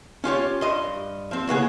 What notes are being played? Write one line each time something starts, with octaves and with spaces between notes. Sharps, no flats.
C#4 F4 G4 C#5
G2 D#5 C6
F3 C4
A2 C#3 B3 G#4